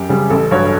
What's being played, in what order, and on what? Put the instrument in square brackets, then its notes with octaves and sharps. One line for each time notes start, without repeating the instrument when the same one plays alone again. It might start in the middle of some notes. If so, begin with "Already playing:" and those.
Already playing: [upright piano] F#2 G4
C#3 G3
A1 A4
G2 F#3 C#5